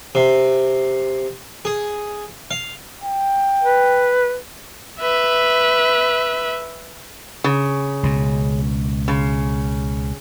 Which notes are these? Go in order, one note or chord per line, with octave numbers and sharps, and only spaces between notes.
C3
G#4
F5
G5
B4
B4 E5
C#3
C#2 B2
C#3